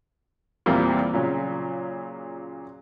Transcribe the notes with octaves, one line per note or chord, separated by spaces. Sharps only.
E2 A#2 G3 A#3 C4
A#2 C#3 F#3